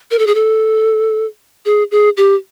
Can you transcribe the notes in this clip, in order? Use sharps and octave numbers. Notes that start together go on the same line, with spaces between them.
A#4
A4
G#4
A4
G#4
G#4
G4